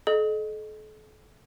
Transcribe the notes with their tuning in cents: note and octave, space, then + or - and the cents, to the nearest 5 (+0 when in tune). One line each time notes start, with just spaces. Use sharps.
A4 -40 D#5 -20